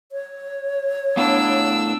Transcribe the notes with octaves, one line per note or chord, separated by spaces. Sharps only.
C#5
A2 B3 D4 F5 E6